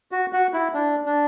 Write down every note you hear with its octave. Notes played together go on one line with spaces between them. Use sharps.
F#4
F#4
E4
D4
D4